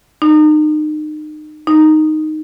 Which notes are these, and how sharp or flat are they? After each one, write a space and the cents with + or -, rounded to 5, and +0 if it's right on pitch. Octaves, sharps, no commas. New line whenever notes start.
D#4 -30
D#4 -5